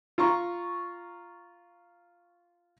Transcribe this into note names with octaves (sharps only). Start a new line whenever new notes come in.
F4 A#5 C#6